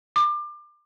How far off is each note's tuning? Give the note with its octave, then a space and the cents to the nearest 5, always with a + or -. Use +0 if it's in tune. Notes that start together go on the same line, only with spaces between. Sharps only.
D6 +30